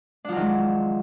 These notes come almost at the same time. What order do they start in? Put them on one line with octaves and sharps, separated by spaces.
D4 F3 F#3 D#3 G#3